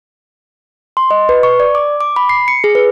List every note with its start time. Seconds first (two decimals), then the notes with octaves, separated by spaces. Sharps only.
0.97 C6
1.11 D#5
1.29 B4
1.43 C#6
1.60 D5
1.75 D6
2.01 D6
2.16 B5
2.29 C7
2.48 C#7
2.64 G#4
2.75 B4